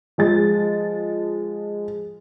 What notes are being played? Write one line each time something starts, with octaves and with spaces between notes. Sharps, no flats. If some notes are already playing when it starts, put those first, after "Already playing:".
F3 G#3 A6